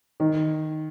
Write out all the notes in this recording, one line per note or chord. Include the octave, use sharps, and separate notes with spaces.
D#3